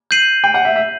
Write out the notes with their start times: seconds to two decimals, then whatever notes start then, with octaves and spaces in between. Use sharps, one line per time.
0.11 G6 C7 D#7 F#7
0.44 G5
0.54 F#5
0.65 E5
0.76 E5